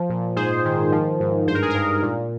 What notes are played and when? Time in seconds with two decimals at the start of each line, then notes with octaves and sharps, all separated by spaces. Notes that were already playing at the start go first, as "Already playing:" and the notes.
Already playing: F3
0.10 A#2
0.36 G#2 G#4 C5
0.65 D#3
0.92 F3
1.20 G#2
1.47 G2 C5
1.55 A#4
1.62 G#4
1.70 A#4
1.75 G2
2.03 A#2